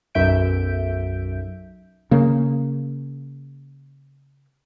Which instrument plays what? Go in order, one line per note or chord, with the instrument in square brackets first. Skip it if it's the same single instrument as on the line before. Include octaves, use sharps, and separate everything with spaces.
[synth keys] B1 F#2 E5 G6 D7
[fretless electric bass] C#3 A#3